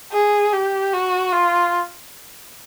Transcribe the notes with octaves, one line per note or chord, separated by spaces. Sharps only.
G#4
G4
F#4
F4